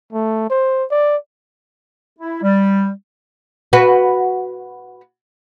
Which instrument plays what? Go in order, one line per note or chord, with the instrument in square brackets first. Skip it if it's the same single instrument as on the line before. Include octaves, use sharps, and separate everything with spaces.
[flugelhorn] A3
C5
D5
[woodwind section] E4
G3
[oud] F#4 B4